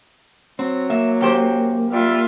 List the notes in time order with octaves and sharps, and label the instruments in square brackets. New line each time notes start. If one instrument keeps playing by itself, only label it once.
[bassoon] F#3 [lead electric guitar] C4
[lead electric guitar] A#3 [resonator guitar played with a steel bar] E5
[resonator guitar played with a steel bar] F#2 G4 C5
[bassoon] G3 [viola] F4 E5